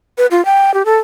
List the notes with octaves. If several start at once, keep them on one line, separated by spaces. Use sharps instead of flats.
B4
F4
G5
G4
A4